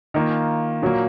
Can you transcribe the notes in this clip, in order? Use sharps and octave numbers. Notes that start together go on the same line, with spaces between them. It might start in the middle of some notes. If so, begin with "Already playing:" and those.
D#3 A#3 F4
A#2 F#3 A#3